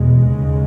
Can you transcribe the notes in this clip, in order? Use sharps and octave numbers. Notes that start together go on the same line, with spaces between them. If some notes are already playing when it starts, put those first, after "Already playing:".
Already playing: E2 B2 G#3
D#2 C#3